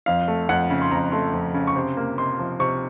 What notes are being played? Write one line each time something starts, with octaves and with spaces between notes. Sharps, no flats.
F2 F5
A3
F2 F#5
C#3
C6
F2 A#5
A3 C6
F2
C#3
C#6
C3 C6
A#3
C3 C6
F3
C3 C#6